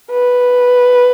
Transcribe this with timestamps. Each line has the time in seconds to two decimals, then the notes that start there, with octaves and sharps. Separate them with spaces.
0.11 B4